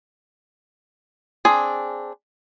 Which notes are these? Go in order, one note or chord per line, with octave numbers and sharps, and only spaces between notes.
C4 D4 G#4 G#5